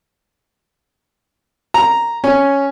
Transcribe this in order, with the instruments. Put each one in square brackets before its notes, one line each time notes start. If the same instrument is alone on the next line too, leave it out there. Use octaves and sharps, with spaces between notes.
[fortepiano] A#5
C#4